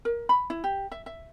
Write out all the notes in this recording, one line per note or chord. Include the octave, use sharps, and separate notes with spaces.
A#4
B5
E4
G4
E5
E5